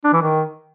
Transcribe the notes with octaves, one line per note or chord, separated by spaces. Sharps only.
D4
E3
D#3